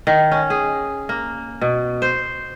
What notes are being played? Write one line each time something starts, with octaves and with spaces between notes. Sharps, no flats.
D#3
C#4
G#4
A#3
B2
C5